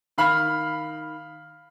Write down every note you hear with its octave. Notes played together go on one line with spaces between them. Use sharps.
D#3 F5 B5 F6